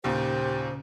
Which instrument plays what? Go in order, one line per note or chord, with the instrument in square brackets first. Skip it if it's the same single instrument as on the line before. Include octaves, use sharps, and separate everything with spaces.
[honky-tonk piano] D#2 A#2 [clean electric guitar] C#3 [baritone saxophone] G4 [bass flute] C5